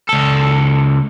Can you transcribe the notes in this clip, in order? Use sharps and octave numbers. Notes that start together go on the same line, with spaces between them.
C#2 A4